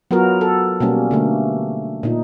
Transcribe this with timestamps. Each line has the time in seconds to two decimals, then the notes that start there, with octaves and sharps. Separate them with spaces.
0.11 F#3 B3 F4 F#4 A#4
0.41 A4
0.80 B2 G3 A#3 C#4
1.11 D3 A3 A#3
2.03 A#2 D#4